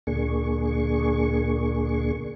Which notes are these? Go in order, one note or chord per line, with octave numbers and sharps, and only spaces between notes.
D2 A#2 A#3 D4 G#4 C#6